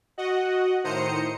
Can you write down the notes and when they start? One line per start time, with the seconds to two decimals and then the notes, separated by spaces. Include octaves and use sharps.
0.18 F#4 D#5 F#5
0.84 A2 D#3 C5 A#5 D#6 C#7